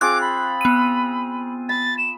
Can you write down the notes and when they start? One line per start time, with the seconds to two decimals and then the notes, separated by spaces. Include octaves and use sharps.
0.01 C4 F4 G#4 D6 F#6
0.21 B5
0.61 B3 D#7
1.69 B5 A6
1.98 E7